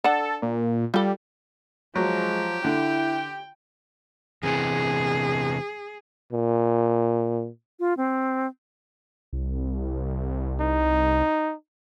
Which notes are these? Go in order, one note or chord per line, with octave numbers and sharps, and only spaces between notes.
D4 A4 F#5
A#2
G3 F4 A4
F3 F#3 G#3 G4
D3 E4 G5
E2 C3 E3 G#4
A#2
F4
C4
C2
D#4